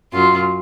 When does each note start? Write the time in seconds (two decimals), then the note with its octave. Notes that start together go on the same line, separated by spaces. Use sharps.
0.13 F#2 F4